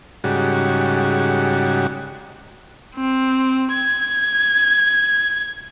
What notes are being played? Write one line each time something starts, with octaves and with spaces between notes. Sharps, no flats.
G#2 C#3 G3 F#4
C4
G#6